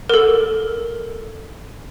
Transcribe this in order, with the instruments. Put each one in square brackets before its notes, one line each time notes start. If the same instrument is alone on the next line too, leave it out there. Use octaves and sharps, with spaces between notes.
[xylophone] A4 A#4